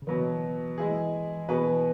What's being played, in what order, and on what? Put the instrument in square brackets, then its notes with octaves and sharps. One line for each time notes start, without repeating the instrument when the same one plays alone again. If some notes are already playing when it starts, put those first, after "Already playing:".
[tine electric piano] C#3
[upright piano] B2 F#3 B3 [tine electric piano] E3
[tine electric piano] E3 [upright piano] G#3 E4 G#4
[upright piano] B2 B3 G#4 B4 [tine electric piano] E3